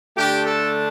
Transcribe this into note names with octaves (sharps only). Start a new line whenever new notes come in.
D3 A3 D4 G4
A4